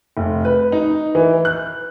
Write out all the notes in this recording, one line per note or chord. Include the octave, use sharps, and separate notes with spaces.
F1
B4
D#4
E3
F#6